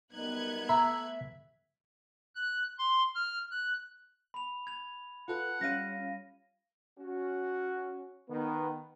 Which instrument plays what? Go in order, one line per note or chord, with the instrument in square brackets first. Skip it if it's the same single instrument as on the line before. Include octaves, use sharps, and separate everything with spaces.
[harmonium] F#2 G3 D#4 [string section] B3 F#6 G#6
[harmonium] A3 [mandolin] E5 [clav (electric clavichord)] A#5
[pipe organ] F#6
C6
F6
F#6
[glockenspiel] B5 F7
G#6 F7
[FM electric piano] F4 A4 B4 [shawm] F#5
[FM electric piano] G3 F4 F5 [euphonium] C#4 [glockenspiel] A#6 D#7
[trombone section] C#4 F#4
D#3 B3